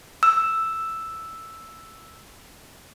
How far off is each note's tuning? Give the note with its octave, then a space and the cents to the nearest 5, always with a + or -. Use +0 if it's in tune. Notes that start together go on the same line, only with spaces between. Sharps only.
E6 +0